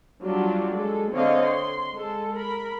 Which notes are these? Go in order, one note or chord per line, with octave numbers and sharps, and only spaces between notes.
F#3 G3 D4 F4
G#3 A4
D3 C4 C#5 D#5 F5
C6
G#3 A4
A#4 B5